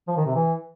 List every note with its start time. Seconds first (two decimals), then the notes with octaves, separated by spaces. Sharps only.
0.08 F3
0.17 D#3
0.26 C3
0.35 E3